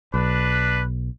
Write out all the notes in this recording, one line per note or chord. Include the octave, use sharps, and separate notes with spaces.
B1 D4 B4